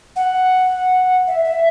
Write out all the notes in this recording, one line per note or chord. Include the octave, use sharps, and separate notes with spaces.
F#5
E5
E5